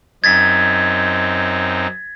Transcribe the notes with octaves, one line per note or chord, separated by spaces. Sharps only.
F#2 C4 D#4 G#6 A6 B6